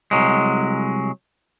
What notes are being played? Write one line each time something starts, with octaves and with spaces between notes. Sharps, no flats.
C2 F#3 G#3